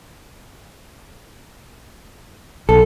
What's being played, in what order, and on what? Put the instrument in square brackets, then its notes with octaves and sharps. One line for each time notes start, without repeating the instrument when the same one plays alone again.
[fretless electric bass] B1 [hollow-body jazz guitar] A4